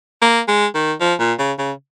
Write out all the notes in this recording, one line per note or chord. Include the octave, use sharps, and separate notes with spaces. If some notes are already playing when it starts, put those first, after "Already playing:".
A#3
G#3
D#3
F3
A#2
C#3
C#3